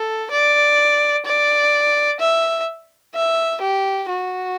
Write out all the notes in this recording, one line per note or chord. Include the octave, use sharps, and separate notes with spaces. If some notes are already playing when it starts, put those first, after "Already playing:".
Already playing: A4
D5
D5
E5
E5
G4
F#4